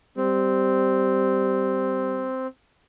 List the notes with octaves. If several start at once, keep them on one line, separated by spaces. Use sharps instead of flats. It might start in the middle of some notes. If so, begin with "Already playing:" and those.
G3 C4